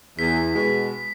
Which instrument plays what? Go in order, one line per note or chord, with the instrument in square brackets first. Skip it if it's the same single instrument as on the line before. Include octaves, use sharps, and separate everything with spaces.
[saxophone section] E2 [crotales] B6
[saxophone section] B2 G#3